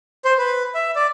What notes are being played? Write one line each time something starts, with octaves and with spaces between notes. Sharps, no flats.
C5
B4
E5
D5